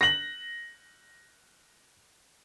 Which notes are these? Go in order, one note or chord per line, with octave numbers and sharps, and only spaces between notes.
A#6 F#7